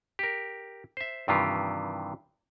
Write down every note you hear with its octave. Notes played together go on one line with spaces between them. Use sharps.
G4 A#4
C5 E5
G2 C3 D#3 E3 F4 G4